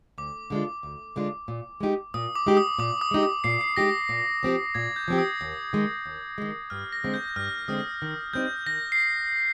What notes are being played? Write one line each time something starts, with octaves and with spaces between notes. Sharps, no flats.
D2 D6
D3 G#3 D4 F4
D2
D3 G#3 D4 F4
A#2
G#3 D#4 G4
A#2 D#6
D6
G#3 D#4 G4
D#6
A#2 D6
D#6
G#3 D#4 G4
D#6
A#2 C7
C7
G#3 D#4 G4 A#6
A#2
F3 C4 G4
A#2 G#6
G6
F3 C4 G4
D#6
D#2
D#3 G#3
D#2
D#3 G#3
G2 F6
A#6
D3 G#3 C4
G6
G2 F6
D3 G#3 C4 D#6
D#3
G3 C4 D#4 G6
D#3 A#6
C7